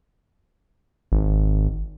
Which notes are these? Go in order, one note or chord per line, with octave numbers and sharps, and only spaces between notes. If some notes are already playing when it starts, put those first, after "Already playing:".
G#1